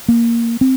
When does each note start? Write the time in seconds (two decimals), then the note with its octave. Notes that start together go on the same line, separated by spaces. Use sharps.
0.08 A#3
0.61 C4